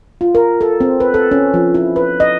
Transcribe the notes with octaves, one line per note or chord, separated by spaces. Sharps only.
F4
A#4
A4
C4
B4
A4
C#4
F3
E4
B4
D#5